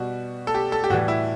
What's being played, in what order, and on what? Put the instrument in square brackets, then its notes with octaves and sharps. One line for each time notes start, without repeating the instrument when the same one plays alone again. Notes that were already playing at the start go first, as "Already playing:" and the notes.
Already playing: [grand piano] B2 G3 F#4
A4
G4
A4
G4
A2 E3 G3 F#4
E4